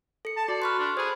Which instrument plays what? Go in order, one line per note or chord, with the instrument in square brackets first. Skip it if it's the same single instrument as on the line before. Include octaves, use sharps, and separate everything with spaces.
[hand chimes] A4 C#7
[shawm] A5
[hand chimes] F#4 [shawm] D5
[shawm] B4 [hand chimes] C6 C#6 F6
[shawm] D4
[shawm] G#4 [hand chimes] C5 B5